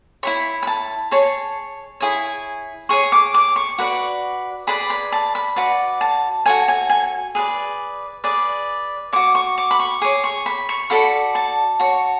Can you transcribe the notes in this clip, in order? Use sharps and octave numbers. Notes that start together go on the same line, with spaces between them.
E4 G#4 C#5 B5
B5
A5
G#4 C#5 A5
E4 G#4 C#5
G#4 C#5 C#6
D6
D6
C#6
F#4 B4 D5
G#4 B4 D5 B5
B5
A5
B5
F#4 B4 D5
A5
F#4 A4 C#5 G#5
G#5
G#5
G#4 B4 D5
G#4 B4 D5
F#4 C#5 D6
C#6
D6
B5
C#6
G#4 C#5 D6
C#6
B5
C#6
F#4 A4 D5 B5
A5
F#4 C#5